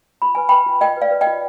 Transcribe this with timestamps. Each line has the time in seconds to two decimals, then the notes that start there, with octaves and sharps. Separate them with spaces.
0.22 F4 B5
0.35 B4 G#5
0.49 B4 G5 B5
0.66 F4
0.81 F4 D#5 G5
0.97 B4 D5 F5
1.11 B4
1.21 D#5 G5
1.27 F4